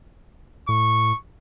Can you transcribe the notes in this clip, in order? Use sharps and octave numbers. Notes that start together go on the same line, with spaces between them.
A2 C#6